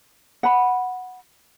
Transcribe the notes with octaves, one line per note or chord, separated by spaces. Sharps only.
F#5 B5